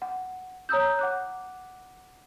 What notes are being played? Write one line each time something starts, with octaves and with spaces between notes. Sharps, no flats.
F#5
C#5 A#5 D#6 E6 G6
F#5 D6 F#6